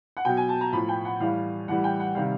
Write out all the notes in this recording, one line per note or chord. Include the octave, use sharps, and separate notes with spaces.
F#5
B2 F#3 G5
G#5
A5
A#5
A2 F3 B5
G5
F#5
A2 E3 G3 F5
A2 E3 G3 F#5
G5
F#5
C3 D#3 G3 F5